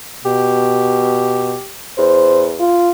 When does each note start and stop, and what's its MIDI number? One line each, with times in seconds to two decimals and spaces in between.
0.25 1.56 47
0.25 1.71 67
1.98 2.62 40
1.98 2.46 72
2.60 2.91 65